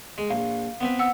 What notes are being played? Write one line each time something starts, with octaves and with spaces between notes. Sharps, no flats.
G#3
A#1 F5
B3 C4 B4
F#5 E6